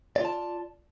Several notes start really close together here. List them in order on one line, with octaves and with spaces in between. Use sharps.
D5 F4 A5